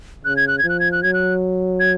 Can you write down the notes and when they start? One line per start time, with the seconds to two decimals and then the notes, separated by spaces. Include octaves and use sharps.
0.25 C#3 F#6
0.37 G#6
0.48 F#6
0.59 G#6
0.64 F3
0.69 F#6
0.80 G#6
0.92 F#6
1.03 F#3 G#6
1.14 F#6
1.80 G#6